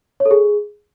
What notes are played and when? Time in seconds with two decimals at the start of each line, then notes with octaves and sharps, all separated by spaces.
0.20 C#5
0.25 A4
0.31 G#4